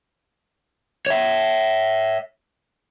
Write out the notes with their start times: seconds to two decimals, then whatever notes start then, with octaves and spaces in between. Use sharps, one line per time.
1.07 C#5 E5